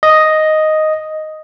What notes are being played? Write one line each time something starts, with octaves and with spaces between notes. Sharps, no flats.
D#5